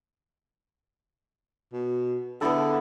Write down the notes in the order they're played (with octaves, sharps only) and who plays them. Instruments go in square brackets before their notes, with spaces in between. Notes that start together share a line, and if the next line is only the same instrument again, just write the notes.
[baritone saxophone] B2
[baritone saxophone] D3 [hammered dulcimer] B3 E4 A4